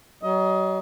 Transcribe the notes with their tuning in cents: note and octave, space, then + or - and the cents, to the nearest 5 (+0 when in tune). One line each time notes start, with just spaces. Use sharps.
F#3 +45 D#5 +25